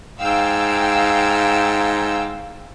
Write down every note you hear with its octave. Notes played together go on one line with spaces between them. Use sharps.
G#2 F5 G5 E6